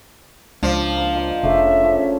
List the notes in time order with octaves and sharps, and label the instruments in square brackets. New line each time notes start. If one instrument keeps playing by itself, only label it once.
[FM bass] C#2 [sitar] F3 [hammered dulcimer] D4
[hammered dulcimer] A#3 D6
F4 D#5
[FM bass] F1 [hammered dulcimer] C#3 A3 D4 [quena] E5
[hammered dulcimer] F3 C#4